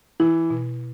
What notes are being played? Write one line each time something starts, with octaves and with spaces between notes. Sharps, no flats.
E3 E4
B2